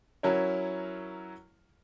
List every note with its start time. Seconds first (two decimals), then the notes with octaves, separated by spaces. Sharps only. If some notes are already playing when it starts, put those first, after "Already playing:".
0.23 F#3 C#4 E4 A#4 C#5